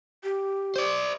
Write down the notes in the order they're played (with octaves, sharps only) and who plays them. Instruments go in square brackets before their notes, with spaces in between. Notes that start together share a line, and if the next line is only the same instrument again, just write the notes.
[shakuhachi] G4
[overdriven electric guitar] C5 D5